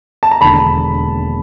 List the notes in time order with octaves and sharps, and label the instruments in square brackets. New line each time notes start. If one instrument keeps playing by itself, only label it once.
[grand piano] A5
A#5
E1 D#2 D3 A5 B5